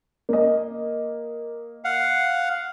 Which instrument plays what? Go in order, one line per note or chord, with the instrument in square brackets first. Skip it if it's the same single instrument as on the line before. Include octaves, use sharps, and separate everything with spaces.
[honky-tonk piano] A#3 D#5
[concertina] F5 F#5